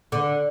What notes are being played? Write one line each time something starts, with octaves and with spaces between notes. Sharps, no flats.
D3